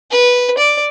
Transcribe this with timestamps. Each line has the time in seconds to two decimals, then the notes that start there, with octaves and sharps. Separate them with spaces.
0.11 B4
0.58 D5